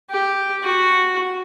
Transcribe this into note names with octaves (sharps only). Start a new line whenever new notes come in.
G4
F#4